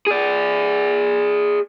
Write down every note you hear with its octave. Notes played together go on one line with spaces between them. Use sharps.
G#4 D5